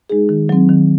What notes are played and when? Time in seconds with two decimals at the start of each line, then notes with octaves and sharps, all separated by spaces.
0.10 G#3 D#4 G#4
0.29 D#3
0.49 F#3 C4
0.69 D#3